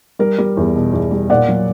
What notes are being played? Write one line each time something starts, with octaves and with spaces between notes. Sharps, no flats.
G3 A#4
G3
E2
B2
E2
G3
A#2 D5 F#5
F#3